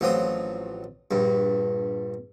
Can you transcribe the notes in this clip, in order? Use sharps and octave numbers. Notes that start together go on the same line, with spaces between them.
A1 F3 F#3 C4 D#6
A#1 G2